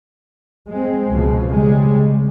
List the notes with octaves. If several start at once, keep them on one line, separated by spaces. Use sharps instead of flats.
G#3 C4
C#2 B2 F3 G#3
C#3 G3 G#3
C2